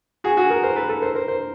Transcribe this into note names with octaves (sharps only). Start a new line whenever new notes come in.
F#4 G#4
F#4 G#4
G#4 A#4
A#4 C5
A4 B4
A4 B4
A#4 C5
A#4 C5
A#4 C5